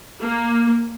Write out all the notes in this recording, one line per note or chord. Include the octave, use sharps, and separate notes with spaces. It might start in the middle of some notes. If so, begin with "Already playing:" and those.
A#3